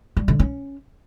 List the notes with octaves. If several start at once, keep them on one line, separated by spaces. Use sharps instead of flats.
G3
D3
C#4